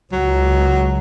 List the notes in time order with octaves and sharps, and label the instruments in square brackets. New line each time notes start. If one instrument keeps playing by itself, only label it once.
[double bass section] C#2 [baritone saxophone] F#3